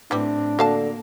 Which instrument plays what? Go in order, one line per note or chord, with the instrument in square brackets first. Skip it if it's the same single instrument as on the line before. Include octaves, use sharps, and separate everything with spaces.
[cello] A2 C4 [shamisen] E3 G3 [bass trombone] D4
[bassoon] D3 [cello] A#3 [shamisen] F#4 F5 A5